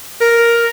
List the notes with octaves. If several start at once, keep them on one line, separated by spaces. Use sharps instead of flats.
A#4